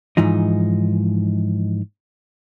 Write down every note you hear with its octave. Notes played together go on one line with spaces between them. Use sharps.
G#2 E3 F3 D#4